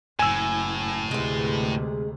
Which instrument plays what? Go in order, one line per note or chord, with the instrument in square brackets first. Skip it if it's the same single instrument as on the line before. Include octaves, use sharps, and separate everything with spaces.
[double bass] F#1 [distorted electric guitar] A2 [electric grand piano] G#5 E6
[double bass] D2 C3 [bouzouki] G#3 B4